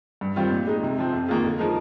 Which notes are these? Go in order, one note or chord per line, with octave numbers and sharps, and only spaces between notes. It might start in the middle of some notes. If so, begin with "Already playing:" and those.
G2
D#3 G3 C4 F4
A#2
G#3 D#4
C3
F3 C4
F2
D#3 A#3 F4 G#4
D3
F3 G#3 D#4 A#4